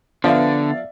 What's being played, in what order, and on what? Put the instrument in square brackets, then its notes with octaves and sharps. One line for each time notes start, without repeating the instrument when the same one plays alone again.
[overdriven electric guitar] D3 [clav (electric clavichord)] F3 [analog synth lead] B3 [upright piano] D5 E5 F5